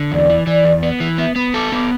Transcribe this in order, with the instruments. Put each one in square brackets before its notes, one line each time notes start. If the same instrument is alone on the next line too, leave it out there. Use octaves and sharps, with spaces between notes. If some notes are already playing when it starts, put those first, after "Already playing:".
Already playing: [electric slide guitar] D3
[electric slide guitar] E2 [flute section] D5
[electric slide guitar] E3
E3
E2
B3
E3
[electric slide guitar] B3 [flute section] E5
[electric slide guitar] B3 [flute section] B5
[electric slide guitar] A4 [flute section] D6
[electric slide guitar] B3 [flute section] D6